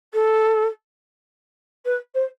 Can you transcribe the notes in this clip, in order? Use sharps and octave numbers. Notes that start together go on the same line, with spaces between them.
A4
B4
C5